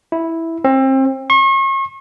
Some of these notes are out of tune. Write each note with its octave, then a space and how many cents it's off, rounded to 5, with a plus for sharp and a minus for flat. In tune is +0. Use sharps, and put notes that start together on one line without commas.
E4 -5
C4 +30
C#6 -40